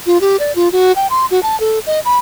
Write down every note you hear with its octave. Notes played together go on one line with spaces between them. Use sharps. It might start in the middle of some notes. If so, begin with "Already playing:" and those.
F4
G4
D5
F4
F#4
G5
C6
F#4
A5
A4
D#5
B5